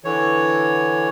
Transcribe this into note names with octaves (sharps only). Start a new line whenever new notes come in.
D3 E3 C#5